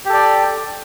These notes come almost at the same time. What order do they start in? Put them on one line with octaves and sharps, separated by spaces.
G4 A4 D5